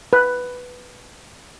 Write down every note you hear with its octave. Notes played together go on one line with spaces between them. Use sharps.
B4